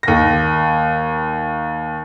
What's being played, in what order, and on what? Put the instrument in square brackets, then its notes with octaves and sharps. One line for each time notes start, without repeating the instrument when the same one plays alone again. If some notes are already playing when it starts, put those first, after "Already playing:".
[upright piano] D#2 A#6